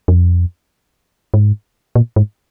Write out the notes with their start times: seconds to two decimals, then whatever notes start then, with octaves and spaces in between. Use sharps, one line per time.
0.08 F2
1.34 G#2
1.95 A#2
2.16 G#2